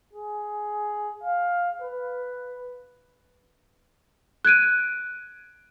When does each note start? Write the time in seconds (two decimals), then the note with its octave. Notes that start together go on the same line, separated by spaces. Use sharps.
0.13 G#4
1.24 F5
1.82 B4
4.45 F#6 G#6 D7 D#7